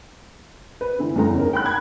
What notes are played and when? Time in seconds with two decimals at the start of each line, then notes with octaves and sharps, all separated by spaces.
0.81 B4
0.99 D3 E3
1.16 E2 G2 C#3 A3 G5 A#5
1.35 C#4 D#4 A#4
1.53 G5 G#5 B5 F#6
1.65 A#5 B5 G#6